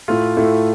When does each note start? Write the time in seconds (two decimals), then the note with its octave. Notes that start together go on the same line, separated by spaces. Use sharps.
0.08 A2 A3 F4
0.37 A2 A3 F4